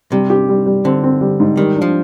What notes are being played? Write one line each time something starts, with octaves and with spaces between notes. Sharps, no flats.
C3 G3
G4
G3
G3
D3 C4
C4
G3
G#2
D#3 G3
D4
F3